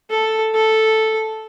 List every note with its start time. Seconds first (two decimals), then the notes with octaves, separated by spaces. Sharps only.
0.10 A4
0.55 A4